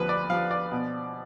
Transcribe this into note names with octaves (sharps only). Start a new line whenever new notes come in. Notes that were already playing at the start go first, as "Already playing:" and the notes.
Already playing: D2 F3 B4
D5
F3 F5
D5
B2